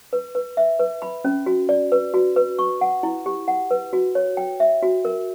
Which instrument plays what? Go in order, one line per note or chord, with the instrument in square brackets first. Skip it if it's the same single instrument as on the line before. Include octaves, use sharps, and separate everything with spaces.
[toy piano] B4
B4
E5
B4
B5
C#4
F#4
D5
B4
F#4
B4
C#6
F#5
E4
G4
F#5
B4
F#4
C#5
G5
E5
F#4
A#4